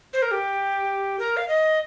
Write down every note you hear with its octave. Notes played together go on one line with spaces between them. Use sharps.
C5
A#4
G4
A#4
F5
D#5